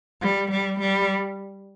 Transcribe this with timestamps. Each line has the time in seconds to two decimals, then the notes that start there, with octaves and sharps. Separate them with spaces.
0.22 G3
0.52 G3
0.81 G3